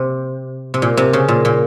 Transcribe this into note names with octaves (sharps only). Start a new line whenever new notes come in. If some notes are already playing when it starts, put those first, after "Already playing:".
Already playing: C3
C3
A#2
C3
C#3
A#2
A#2